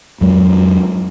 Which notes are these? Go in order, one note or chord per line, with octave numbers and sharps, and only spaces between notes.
F2 F#3 G#3